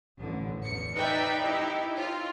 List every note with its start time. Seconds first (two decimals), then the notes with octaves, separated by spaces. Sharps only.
0.17 A1 D3
0.63 E2 C#7
0.95 D#4 B4 D5 E5 G5
1.44 D#4 E4 G4
1.96 F4